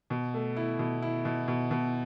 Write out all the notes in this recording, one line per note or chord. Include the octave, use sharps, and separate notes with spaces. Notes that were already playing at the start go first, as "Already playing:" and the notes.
B2
A3
E4
B2
E4
B2
B2
B2